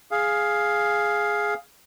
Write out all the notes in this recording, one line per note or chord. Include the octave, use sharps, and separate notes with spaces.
G#4 F5